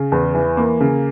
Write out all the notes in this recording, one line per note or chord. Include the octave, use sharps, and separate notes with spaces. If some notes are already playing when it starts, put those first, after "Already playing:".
Already playing: C#3
E2
E3
A#3
C#3